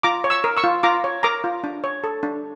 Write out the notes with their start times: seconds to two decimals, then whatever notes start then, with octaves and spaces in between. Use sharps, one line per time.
0.03 F4 A#5 D6
0.24 C#5
0.30 C#6 E6
0.44 A#4
0.57 C#6 E6
0.64 F4
0.83 F4 A#5 D6
1.04 C#5
1.23 A#4 A#5 D6
1.44 F4
1.64 D4
1.84 C#5
2.04 A4
2.23 D4